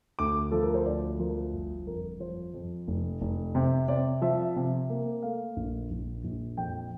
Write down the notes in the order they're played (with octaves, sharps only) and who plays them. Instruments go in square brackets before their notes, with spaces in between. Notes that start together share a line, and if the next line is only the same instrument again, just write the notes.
[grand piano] D2 D6
F3 A4
A#4
C5
D2 D5
F3 A#4
G1
F2 A#4
F3 C5
F2
F1
F1
C3
C3 D5
F3 E5
C3
A#3
A3 F5
A#1
A#1
A#1
F2 G5